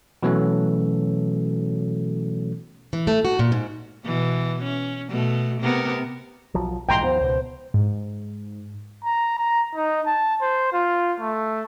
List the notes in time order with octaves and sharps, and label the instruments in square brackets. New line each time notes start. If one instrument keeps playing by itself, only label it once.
[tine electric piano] B2 E3 F#3 A3 C#4 A4
[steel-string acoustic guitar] E3
A3
F#4
A#2
G#2
[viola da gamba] B2 E3
C#4
B2 A3
C3 B3 A#4
[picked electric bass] B1 F3 F#3
[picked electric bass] A#1 G#2 E3 [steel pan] G5 A#5 C6
[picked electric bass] D#2 F3 B3 [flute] C5
[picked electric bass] C#2 B2
[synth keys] G#2
[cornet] A#5
A#5
D#4
A5
C5
F4
A3